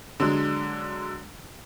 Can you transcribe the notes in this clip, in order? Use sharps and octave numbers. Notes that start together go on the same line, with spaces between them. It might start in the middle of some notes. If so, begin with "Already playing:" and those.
D3 F#3 G#3 D4